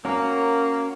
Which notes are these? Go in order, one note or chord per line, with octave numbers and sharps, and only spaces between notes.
A#3 C#4 F#4 A#4